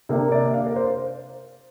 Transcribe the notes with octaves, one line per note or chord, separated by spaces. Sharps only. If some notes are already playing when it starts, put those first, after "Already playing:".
C3 A#3 D4
D5
F5
A#4
C5